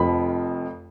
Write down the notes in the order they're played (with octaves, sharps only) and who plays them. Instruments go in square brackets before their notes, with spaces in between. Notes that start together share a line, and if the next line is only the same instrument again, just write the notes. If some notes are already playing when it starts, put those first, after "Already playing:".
Already playing: [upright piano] F1 F2 F3 B5